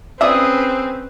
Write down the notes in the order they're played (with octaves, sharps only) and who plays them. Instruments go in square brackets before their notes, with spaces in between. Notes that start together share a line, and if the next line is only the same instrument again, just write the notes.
[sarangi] C4 [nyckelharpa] C#4 B4 [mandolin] G#4 D#6 [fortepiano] D5 E5